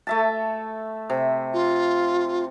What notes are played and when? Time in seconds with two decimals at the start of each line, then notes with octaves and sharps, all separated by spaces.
0.07 A3 E5 A5
1.10 C3
1.53 F4